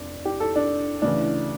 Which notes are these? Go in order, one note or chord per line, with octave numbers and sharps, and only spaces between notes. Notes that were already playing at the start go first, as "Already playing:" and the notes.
Already playing: F1 D4
G4
A4
D4
D2 C#3 E3 D4